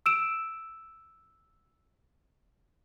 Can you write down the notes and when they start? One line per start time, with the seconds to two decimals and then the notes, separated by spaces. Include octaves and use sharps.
0.06 E6 D7 E7